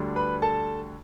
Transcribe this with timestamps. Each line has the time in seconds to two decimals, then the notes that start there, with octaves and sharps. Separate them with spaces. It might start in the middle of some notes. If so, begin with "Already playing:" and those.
Already playing: D2 D3 G3 D4
0.16 B4 B5
0.42 A4 A5